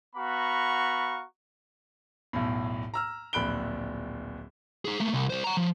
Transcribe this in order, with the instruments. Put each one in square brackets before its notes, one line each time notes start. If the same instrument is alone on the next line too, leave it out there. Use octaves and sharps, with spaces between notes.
[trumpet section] B3 F#4 F5 A#5 B5 C#6
[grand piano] B1 E2 A2
A#5 E6 F6
D1 A#1 B5 F#6 D7 G7
[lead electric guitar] D#4 G#4
A3 A#3
C2
G3 C5
F#5 A#5
F3